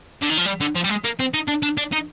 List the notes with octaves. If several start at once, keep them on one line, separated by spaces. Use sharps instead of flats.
D3
D#3
F3
G3
D3
F3
G3
G#3
A#3
C4
D#4
D4
D4
D4
D#4